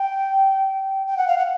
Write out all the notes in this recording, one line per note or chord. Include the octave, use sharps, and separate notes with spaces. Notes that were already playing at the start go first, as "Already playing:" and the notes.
Already playing: G5
G5
F#5
F5
F#5